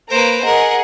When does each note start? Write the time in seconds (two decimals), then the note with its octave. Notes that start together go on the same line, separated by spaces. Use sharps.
0.10 A#3 B4 C5 A#5 D7
0.45 G#4 A#4 D#5 F#5